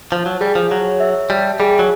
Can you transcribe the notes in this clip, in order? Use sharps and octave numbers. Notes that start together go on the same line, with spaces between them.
F3 A5
F#3
G3 G#4
F3
F#3 C#5
E5
G3 A5
G3 G#4
F#3